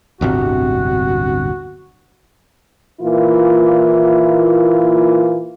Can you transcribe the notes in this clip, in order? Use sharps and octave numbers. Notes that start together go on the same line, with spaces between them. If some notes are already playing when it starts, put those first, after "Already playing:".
D1 G1 C3 F#4
A#2 E3 A#3 E4 F4